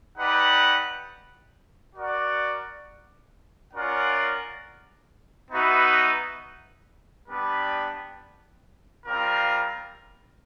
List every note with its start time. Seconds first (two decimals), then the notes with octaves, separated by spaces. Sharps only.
0.18 D#4 G4 B4 D5 F#5
1.96 F#4 A#4 D5 F#5
3.73 C#4 F4 A#4 D5 F#5
5.51 B3 D#4 F#4 B4 E5
7.28 G3 B3 D4 G4 B4
9.06 G3 C4 F4 A#4